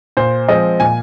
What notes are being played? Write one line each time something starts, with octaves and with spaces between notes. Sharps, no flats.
A#2 C5
F3 G#3 C4 D#5
A#2 G#5